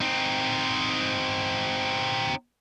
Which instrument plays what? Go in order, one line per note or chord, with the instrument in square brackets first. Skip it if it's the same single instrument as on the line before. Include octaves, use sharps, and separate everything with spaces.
[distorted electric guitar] C4 D#4